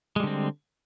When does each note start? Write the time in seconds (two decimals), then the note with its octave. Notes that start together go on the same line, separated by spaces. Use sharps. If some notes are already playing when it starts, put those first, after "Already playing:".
0.16 G#3
0.20 G3
0.23 D3
0.27 C4